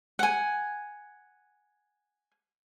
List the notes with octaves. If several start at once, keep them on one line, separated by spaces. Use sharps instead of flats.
F#5 G#5